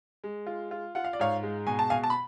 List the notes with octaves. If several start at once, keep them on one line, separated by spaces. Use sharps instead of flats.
G#3
F4
F4
F4 F#5
F5
D5
G#2 C#5 F5
G#3
B2 G#5
A5
B2 F5 G#5
A5
B5